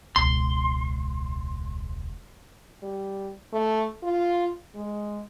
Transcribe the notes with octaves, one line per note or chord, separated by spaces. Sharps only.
E1 C#2 C6
G3
A3
F4
G#3